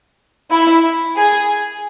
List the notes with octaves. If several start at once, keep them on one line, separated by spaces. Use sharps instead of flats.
E4
G#4